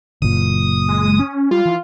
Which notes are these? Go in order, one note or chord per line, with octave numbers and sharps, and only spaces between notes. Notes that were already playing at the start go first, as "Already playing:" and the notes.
F#1 A#2 D#6
G#3
C#4
G3 F4
E3